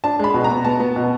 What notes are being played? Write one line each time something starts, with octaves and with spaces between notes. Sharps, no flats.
D4 A5
G#3 B5
B2
A#5
B3
B3 A5
B3
B2